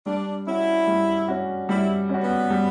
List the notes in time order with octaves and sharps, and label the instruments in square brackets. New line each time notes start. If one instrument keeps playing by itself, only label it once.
[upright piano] G3 [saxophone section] D4
[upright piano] C#4 F#4 [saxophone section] E4
[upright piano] G3
C#4 F#4
[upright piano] G3 [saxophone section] E4
[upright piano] C#4 F#4
[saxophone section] B3
[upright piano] G3